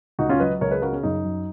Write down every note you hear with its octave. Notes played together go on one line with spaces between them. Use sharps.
C#2 D#4 F#4
C#4 F4
F#3 B4 D#5
C#2 A#4 C#5
G#4 B4
C#3 F#4 A#4
C#4
F#2 D#4
F#3